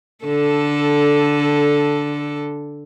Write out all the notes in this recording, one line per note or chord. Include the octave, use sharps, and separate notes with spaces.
D3 A4